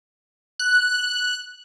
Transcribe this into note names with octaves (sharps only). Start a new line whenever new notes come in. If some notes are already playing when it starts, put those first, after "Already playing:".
F#6